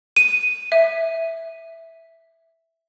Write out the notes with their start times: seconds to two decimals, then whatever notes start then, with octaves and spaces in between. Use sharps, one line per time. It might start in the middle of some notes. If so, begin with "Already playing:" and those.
0.16 D#7
0.72 E5